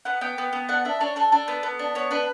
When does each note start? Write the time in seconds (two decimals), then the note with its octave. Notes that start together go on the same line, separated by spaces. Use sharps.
0.05 B3 F#5
0.21 B3 G5
0.38 B3
0.53 B3
0.69 D4 F#5
0.85 D4 E5
1.01 D4 C#5
1.16 D4 A4
1.32 D4
1.48 B3
1.63 B3
1.79 D4
1.95 B3 C#5
2.11 D4 B4